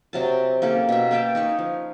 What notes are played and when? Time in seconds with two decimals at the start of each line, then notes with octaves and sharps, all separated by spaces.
0.13 C3 F#3 A5
0.62 A#3 C#4 G4 A4
0.89 B2 E5
1.11 A#3 E5 G5 A5
1.35 D#4 B4 C#5
1.59 F3